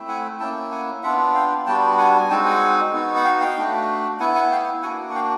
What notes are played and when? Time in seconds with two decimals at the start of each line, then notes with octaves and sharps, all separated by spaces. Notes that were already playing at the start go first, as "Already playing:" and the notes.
Already playing: A3 C4 E4
0.08 F#5 G#5
0.39 A#3 C#4 E4 G5 A5
0.71 F#5 G#5
1.03 B3 D4 F4 E5 F#5
1.34 F5 G5
1.66 G3 B3 D4 F#4 G5 A5
1.98 F#5 G#5
2.18 G#5
2.29 G#3 C4 D#4 F#4 G5 A5
2.46 F#5 G#5
2.93 B3 D#4 F#4
3.16 F#5
3.24 F5 G5
3.40 F5 G5
3.57 A3 D4 F#4
4.20 B3 E4 F#5 G#5
4.35 F#5 G#5
4.51 F5 G5
4.83 A#3 D4 F#4 F#5 G#5
5.10 F#5
5.15 F5 G5